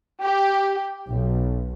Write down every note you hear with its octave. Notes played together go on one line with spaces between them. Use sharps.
G4
B1